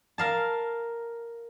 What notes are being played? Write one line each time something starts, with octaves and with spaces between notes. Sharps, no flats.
A#4 F5 A5